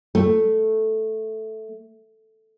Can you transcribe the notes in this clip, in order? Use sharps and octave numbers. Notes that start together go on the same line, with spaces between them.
A3